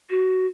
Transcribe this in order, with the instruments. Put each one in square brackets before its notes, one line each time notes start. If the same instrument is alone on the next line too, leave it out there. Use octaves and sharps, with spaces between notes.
[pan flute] F#4